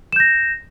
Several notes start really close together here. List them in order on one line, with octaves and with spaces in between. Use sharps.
E7 G6 A#6